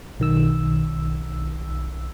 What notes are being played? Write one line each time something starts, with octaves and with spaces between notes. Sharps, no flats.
B1 D#3 E6